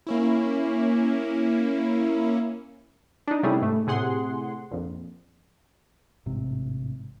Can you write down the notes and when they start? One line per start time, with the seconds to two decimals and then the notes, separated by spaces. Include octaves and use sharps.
0.07 A#3 C#4 E4
3.27 D4 D#4
3.43 C3 G3 A3 C#4 E4 G#4
3.61 G#2 A3
3.87 A2 C3 G#4 F#5 C6
4.71 A#1 F2
6.26 A1 G#2 C3